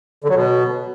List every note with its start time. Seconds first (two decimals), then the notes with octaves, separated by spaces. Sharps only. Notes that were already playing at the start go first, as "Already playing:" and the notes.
0.24 D3
0.30 F#3
0.35 B2